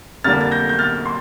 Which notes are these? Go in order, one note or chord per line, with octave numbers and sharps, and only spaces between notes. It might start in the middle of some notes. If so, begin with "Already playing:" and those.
F2 D3 G3 A#3 D4 F6 A6
A6
G6 A#6
G6
F6 A6
C6